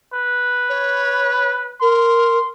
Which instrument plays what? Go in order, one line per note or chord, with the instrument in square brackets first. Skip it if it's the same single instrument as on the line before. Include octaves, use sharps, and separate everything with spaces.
[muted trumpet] B4
[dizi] C#5
[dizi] A#4 [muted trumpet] C6